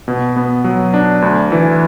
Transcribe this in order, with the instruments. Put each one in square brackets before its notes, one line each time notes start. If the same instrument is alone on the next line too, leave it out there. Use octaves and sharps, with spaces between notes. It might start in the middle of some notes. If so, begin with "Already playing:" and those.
[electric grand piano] B2
B3
F#3
D4
D2
E3